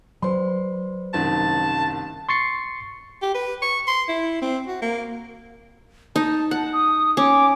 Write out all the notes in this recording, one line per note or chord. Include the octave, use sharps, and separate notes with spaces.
F#3 B4 C5 D5 C6
F#1 C2 D#3 A5
C6 C#6 A6 C7 C#7
G4
B4
C#6
C6
E4
C4
F#4
A#3
D#4 A5
F#5
D#6
C#4 D6